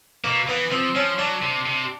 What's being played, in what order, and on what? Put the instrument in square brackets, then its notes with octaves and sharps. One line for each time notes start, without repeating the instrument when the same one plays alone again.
[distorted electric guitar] B2 [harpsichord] A#3
[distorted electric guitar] E3 [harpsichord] B3
[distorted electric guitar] F3 [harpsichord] C4
[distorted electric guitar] F3 [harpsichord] C#4
[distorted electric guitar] F#3 [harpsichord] D4
[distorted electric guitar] C3
C3